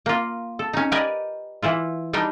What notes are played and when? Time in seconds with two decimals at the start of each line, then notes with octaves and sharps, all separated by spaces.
0.06 A#3 F4
0.59 A4
0.73 C#4 D#4
0.92 G4 A#4 B4 D5 D#5 G#5
1.63 E3 E4 F4
2.13 G3 D4 D#4 G5